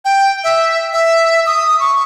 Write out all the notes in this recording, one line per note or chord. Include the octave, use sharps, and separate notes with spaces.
G5
E5
E5
D#6
C#6